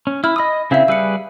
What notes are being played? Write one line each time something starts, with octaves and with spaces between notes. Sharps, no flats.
C#4
E4 B5 F6
D#5 B5 D#6 E6
C#3 C4 E4 E5 F5
G3 G#4 B4 E6 C#7